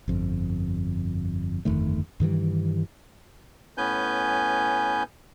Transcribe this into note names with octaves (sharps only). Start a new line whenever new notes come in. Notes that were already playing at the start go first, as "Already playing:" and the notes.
G1 F2
G1 F2 D#3 A3
G2 D#3 E3 G3
A2 B3 C#4 B4 G#5 G6